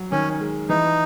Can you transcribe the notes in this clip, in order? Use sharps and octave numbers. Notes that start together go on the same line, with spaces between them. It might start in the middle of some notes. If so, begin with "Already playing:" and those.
Already playing: F#3
D#3 C#4
G#3
E3 D#4